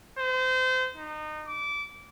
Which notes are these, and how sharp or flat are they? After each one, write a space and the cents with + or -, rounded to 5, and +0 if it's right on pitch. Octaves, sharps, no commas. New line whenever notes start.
C5 -30
D#4 -25
D6 -20